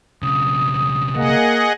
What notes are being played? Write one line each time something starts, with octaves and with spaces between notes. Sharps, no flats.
B1 C#3 D#6
A#3 G#4 D#5 F#5